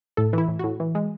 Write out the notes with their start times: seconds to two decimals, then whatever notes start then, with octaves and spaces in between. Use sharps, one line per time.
0.17 A2 A4
0.33 E3 E4
0.48 A2
0.59 A2 F#4
0.80 E3
0.95 G#3